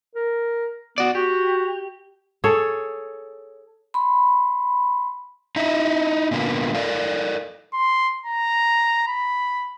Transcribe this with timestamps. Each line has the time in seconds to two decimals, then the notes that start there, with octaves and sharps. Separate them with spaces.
0.15 A#4
0.98 B3 F#4 D5
1.15 F#4 G4
2.44 G#4 A4 C#5
3.94 B5 C6
5.56 D#4 E4 D#5 E5
6.31 A#2 D3 A#3 B3
6.75 A4 A#4 D5 F5
7.74 C6
8.26 A#5
9.07 B5